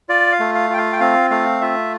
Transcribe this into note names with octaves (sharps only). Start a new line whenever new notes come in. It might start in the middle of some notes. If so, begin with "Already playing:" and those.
F4 D5
F5
A3
F5
F4 G5
F5
G5
C4 F5
A3 F5
F4 E5